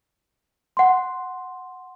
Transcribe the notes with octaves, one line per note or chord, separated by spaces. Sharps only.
F#5 C6